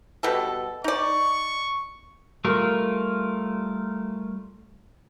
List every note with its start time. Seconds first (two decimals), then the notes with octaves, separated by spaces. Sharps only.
0.23 B2 G3 A4
0.84 D#4 D5 C#6
2.45 G3 A3 F4 A#4